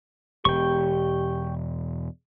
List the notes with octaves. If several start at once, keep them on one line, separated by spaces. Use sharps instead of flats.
E1 G4 G5 C#6